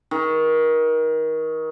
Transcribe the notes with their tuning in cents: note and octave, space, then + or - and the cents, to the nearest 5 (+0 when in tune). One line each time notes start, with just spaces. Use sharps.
D#3 +25